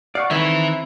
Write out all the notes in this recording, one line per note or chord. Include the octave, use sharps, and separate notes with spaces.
D5 F5 F#5 C#6
D#3 E3 C4 E4 E5 A#5 B5